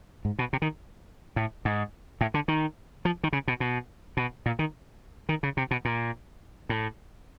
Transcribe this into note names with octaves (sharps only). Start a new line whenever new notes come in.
G#2
B2
C3
D#3
A2
G#2
A2
D3
D#3
F3
D#3
C#3
B2
B2
B2
A#2
D#3
D#3
C#3
C3
B2
A#2
A2